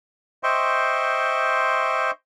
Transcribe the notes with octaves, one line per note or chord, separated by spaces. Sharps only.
C5 D#5 E5 G5 C6 C#6